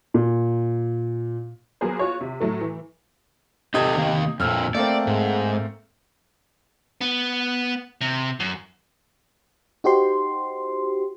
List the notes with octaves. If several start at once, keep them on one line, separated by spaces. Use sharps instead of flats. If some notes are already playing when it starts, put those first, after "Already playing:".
A#2
F#3 A#3 B3 G#4 C5
F4 F#4 C#5
C3
A2 F#3 A3
E3
C3 D#4 G4 A4 D#5 G#6
D#3 A#3
F2 A#2 E6 F6
A3 A#3 C4 D5
G#2
B3
C3
F#2
D#4 F#4 G4 C5 C6